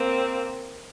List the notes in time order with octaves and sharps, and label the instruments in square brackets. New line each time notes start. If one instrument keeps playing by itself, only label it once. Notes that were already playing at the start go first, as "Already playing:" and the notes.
Already playing: [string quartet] A#3 C4